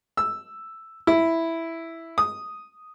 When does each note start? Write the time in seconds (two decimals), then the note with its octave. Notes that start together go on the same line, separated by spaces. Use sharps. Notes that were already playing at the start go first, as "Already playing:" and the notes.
0.17 E6
1.07 E4
2.18 D#6